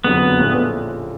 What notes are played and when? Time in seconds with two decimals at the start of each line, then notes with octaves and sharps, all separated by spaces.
0.04 F#1 F2 D3 F#3 B3
0.39 A#1 A2 F3 A3 C#4